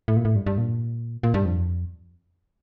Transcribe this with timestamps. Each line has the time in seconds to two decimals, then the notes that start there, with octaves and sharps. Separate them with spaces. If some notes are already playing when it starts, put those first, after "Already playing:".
0.08 A2
0.16 A#2
0.25 A2
0.36 G2
0.46 G2
0.58 A#2
1.23 A#2
1.34 G2
1.46 F2